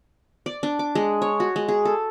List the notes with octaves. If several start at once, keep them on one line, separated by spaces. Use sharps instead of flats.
D5
D4
D6
G#3
C#5
F#4
G#3
G#4
A4